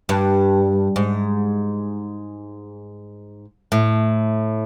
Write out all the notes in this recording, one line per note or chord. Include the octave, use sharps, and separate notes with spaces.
G2
G#2
A2